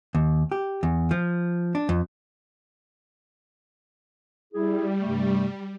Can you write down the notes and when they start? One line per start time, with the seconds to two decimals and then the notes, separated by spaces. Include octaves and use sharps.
0.15 D#2
0.52 G4
0.83 E2
1.11 F3
1.75 D4
1.89 F2
4.54 G3 E4 G#4
5.01 G2 C3 A3